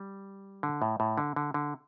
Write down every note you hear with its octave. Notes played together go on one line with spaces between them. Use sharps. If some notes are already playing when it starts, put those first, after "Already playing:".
Already playing: G3
D3
A2
A2
D3
D3
D3